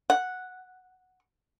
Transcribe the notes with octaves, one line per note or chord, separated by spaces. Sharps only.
F#5